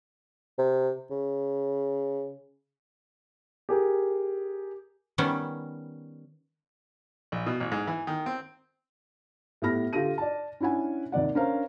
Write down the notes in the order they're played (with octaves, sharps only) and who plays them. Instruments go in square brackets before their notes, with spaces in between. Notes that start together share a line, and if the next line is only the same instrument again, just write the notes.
[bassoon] C3
C#3
[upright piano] G4 G#4 A#4
[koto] D#3 G3 B3 C#4
[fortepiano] A#1
B2
A1
G#2
E3
D#3
C4
[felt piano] A2 B3 G4 B5 F6 A#6
D3 F4 G4 A4 A#6 D#7
D5 A5
C#4 D4 E4 F#5 G#5
D#2 C3 D5 F#5
C#4 D4 A#4 C5 F5 A#5